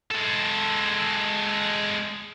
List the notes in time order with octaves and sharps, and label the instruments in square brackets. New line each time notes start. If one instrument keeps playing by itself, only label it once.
[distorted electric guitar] G#3 A4